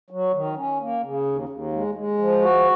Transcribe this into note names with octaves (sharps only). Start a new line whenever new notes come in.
F#3
D#3
C#4
A#3
C#3
D#2
D#2
G#3
G#3
F3
F#4